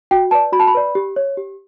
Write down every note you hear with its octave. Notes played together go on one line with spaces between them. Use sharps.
F#4 G5
B4 D5 A5
F#4 B5
A5
B5
B4 D5
G4
C#5
G4